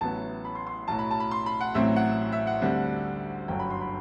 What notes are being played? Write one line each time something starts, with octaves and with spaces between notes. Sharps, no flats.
A1 A2 F#3 B3 A5
B5
C6
C6
B1 A2 F#3 A5
B5
A5
B5
C6
B5
F#5
A1 A2 F#3 C4 E5
F#5
E5
F#5
D2 D3 G3 C4
G1 F#2 D3 F#3 G5
B5
C6
B5